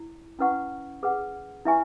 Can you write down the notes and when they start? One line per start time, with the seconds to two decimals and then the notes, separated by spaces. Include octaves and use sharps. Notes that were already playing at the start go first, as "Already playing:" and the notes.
Already playing: E4
0.39 C#4 E4 B4 F#5 C#6
1.03 G#4 B4 F#5
1.65 E4 B4 E5 G#5 C#6